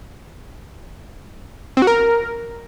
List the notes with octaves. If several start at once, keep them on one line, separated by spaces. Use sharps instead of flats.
C4
F#4
A#4